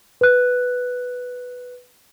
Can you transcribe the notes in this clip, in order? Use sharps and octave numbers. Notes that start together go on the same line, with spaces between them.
B4 F#6